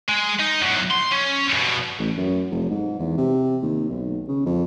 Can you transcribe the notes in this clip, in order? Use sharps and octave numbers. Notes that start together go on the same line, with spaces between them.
G#3
D#4
E2 F#3
C6
C#4
G2 B2
A1
F#2
F1
G#2
E2
C3
D#2
B1
C#3
F2